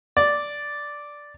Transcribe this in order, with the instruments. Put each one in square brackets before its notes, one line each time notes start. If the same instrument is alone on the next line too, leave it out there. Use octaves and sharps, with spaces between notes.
[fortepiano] D5